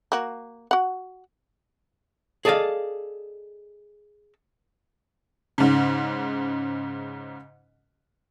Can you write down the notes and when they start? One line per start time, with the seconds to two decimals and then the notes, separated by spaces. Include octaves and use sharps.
0.12 A#3 F#4
0.71 F#4 F#5
2.45 G#4 A4 D5 D#5 F5
5.58 G#2 C#3